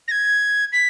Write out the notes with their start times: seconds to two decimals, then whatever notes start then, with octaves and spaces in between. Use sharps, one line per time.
0.08 A#6
0.11 G#6
0.73 B6